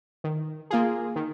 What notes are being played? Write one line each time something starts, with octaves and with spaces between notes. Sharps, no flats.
D#3
A#3 F4 G#4
D#3